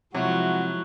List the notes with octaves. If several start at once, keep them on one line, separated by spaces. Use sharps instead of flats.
C3 F3 F#3 G#3 E4 F#4